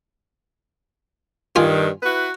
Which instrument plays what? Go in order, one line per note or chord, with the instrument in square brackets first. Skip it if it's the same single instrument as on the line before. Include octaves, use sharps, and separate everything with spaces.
[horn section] G2 D#3 [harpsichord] F4 G#5
[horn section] E4 F#4 B4